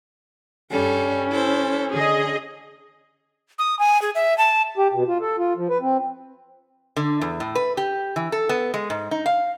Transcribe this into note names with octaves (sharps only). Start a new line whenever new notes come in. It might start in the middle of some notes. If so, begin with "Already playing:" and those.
G2 G3 C#4 A4
E4 A4 C5
D3 G#4 D#5
D#6
G#5
G#4
E5
A5
G4
B2
F4
A4
F4
F3
B4
C4
D3
E2
A2
B4
G4
E3
A4
B3
G#3
G#2
D#4
F5